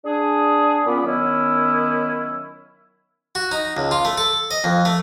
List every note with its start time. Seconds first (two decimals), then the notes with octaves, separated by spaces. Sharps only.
0.05 D4 G#4
0.86 A#2 B3 C#4 B5 D6
1.05 D#3 F#3 B3 C#4 E4
3.35 F#4
3.51 D#4
3.77 C#2
3.91 F4
4.05 A3
4.17 A4
4.51 D#5
4.64 F2
4.85 A3